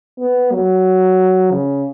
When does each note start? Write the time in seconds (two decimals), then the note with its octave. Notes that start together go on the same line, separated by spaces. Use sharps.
0.19 B3
0.52 F#3
1.51 C#3